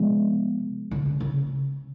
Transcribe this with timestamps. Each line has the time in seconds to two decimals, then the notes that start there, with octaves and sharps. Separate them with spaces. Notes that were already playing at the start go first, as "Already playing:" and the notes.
Already playing: C3 F3 G#3 B3
0.91 C#3
1.06 D3
1.20 C#3